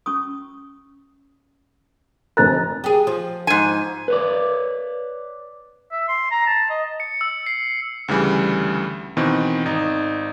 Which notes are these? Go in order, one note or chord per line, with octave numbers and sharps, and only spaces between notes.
C#4 C#6 D#6
F1 A#4 B4 D#5 A#5 F#6 A6
G4 G#4
F3
G#2 G#5
B4 C#5 D5
E5
C6
A#5
A5
D#5
C#7
E6
C7
D2 C#3 E3 G3
B2 D#3 E3 C4
G#1 D#4